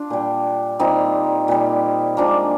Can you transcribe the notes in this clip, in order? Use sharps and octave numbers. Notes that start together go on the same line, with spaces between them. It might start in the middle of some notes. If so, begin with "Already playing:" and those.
Already playing: D4 F4
A#2 G3
A#2 G3 C4 D#4
A#2 G3
A#2 F3 G#3 A#3 D4